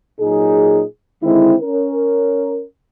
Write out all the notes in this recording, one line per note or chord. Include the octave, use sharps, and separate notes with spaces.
A#2 F#3 D#4 G#4
D3 D#3 G#3 C4 D#4 E4
C#4 A#4